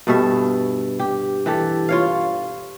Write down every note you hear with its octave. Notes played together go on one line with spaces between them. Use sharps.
G2 B2 A4 E5
G4
E3 G4 A4
F4 C#5 F5